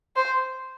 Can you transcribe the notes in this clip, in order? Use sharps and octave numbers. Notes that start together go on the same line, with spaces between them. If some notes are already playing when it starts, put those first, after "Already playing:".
C5